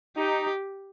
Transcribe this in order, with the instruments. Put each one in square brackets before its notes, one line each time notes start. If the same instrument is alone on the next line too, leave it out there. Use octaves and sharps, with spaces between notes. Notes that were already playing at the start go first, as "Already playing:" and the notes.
[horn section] D#4 [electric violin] G4